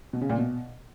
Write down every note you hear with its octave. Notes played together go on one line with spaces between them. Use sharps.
B2
C#3
A#2
B2